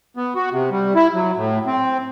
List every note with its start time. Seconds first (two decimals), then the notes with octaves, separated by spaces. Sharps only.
0.17 B3
0.35 F#4
0.52 C3
0.71 G3
0.95 E4
1.14 F#3
1.36 A2
1.66 C4